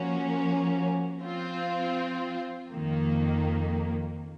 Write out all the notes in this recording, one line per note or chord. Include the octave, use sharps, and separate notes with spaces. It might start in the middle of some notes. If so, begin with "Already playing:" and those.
Already playing: F3 A#3 C#4 F#4
F3 C4 F4
F2 D#3 A#3